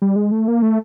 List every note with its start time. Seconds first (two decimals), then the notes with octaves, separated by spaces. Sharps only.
0.02 G3
0.16 G#3
0.32 A3
0.48 A#3
0.62 A3